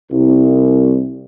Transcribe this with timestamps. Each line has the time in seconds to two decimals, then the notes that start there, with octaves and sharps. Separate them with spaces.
0.11 C2